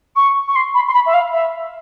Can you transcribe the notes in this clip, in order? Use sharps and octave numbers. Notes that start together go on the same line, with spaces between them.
C#6
C#6
C6
B5
C6
B5
E5
F5
E5